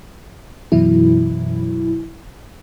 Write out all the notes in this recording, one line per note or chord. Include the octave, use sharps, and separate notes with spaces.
F#2 B2 E3 F#3 E4